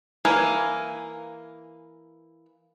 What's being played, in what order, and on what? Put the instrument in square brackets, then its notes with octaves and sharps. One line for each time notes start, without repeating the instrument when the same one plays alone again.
[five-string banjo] E3 A#3 [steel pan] G#5